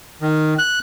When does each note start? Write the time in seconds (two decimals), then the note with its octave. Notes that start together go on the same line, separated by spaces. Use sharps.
0.22 D#3
0.59 F#6